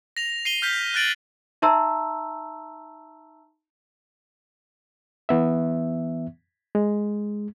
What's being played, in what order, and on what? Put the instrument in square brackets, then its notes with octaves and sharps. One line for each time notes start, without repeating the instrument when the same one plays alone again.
[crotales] A#6 F7
C7 D#7 G7
F6 G6 B6
F#6 G6 A6 D7 D#7 F#7
[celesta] D#4 E5 A5 A#5 C6 E6
[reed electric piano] E3 B3 E5
G#3